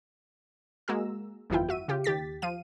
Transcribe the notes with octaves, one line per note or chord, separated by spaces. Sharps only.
G#3 A#3 F#4 A#5 E6
G1 F2 E3 E4 F4 G5
F#4 E5 D#7
C#3 F4 G4
D#2 G4 A6 B6
F3 F5 D#7